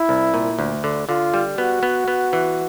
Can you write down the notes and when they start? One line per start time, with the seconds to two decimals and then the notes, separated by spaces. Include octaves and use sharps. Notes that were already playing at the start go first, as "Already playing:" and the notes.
Already playing: E4
0.09 C2
0.34 A#2
0.59 D2
0.84 D3
1.08 D3 F4
1.34 G3
1.58 B3 F#4
1.83 B3
2.08 B3
2.33 E3